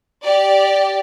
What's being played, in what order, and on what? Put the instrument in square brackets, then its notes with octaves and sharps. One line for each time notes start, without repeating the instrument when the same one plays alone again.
[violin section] G4 D5